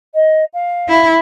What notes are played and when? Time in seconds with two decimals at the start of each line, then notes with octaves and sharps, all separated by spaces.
0.15 D#5
0.54 F5
0.89 E4